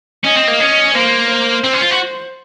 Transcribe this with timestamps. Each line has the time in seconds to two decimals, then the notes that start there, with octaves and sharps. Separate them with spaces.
0.24 C#4 D#5
0.36 C4
0.48 A#3
0.60 C#4
0.95 A#3 C5
1.29 C5
1.64 C4
1.73 C#4
1.81 F4
1.90 F#4